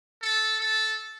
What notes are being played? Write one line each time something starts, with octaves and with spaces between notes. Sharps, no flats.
A4
A4